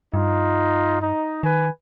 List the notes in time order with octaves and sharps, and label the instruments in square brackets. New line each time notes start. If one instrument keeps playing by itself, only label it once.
[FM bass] G2 [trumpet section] D#4 F4
[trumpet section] D#4
[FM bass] D#3 [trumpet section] B4 G#5